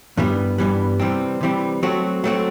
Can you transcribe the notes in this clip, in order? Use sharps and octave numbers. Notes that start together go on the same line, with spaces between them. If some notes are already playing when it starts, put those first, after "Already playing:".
G2 E3 G3 B3
G2 E3 G3 B3
C3 E3 G3 C4
C3 E3 G3 C4
F#3 A3 C4 F#4
F#3 A3 C4 F#4